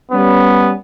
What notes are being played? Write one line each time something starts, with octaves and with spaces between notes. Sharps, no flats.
G3 B3 C#4